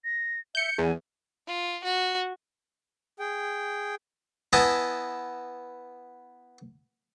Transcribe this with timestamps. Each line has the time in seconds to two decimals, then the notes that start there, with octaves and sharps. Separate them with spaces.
0.04 A#6
0.55 E5 G6 C#7
0.78 E2 G#5
1.48 F4
1.84 F#4
3.19 G#4 G5
4.53 B3 E4 D#5 G#5 A5